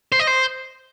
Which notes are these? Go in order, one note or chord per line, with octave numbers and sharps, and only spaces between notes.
C5
D#5
C5